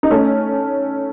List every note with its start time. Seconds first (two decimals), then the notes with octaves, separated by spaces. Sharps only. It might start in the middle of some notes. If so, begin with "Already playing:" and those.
0.03 D#4
0.11 A3 C#4